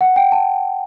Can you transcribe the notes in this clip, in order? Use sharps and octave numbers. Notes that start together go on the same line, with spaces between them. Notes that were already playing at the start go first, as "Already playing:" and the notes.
F#5
G5
A5